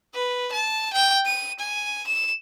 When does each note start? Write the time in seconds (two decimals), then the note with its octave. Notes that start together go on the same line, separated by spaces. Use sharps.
0.14 B4
0.52 A5
0.93 G5
1.26 D#7
1.60 G#5
2.07 E7